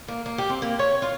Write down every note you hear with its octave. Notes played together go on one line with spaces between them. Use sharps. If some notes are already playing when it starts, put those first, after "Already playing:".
A#3
A#3
G4
C4
A#3
C#5
F4